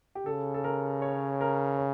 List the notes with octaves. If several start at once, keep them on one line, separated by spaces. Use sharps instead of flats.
G4
C#3 A4
A4
A#4
C#5
A#4
C#5